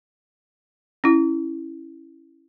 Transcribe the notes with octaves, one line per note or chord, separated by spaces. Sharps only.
C#4 E4